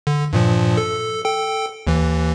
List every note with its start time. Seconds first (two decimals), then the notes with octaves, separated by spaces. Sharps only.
0.07 D3
0.33 G2 A#2 F3
0.77 A4
1.24 A4 G5
1.87 D#2 E3